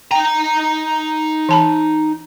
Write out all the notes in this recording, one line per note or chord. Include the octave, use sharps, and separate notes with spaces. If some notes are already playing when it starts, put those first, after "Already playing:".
D#4 G5 A#5
E3 A5 B5